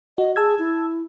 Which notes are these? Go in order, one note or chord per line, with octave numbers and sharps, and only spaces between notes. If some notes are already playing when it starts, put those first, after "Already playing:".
F#4 D#5
G#4 A5 E6 G#6
E4